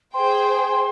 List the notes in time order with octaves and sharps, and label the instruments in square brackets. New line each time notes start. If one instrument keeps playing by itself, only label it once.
[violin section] G#4 C5 G5 [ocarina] C6